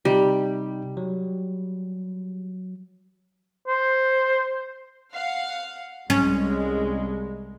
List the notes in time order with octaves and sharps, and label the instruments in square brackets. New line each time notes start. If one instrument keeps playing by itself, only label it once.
[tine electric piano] C3 D#4 [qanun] G3
[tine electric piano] F#3
[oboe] C5
[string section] F5 F#5
[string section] C2 G#3 [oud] C#4